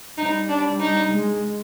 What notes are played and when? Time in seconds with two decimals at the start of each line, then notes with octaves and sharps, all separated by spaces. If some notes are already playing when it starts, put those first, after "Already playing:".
0.18 G3 D#4
0.49 D4
0.80 D#4
1.11 G#3